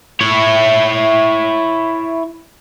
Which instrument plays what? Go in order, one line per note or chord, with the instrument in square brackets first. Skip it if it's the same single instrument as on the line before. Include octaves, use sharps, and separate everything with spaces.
[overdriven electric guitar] E4 C#5